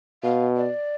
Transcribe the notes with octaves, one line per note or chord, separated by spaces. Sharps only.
B2 F5
D5